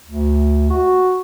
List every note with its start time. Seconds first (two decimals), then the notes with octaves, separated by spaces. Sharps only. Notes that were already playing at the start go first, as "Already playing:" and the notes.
0.07 D2
0.70 F#4